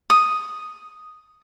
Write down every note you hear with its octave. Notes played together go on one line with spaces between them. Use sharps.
D#6